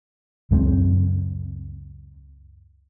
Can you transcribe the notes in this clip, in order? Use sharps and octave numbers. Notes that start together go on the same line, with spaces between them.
C#2 F#2 G#3 C4